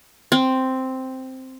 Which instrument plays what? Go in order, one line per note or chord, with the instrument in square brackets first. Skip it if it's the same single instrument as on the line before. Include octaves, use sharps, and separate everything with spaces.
[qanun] C4